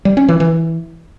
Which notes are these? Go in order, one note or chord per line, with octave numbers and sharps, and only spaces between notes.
G3
C#4
E3
E3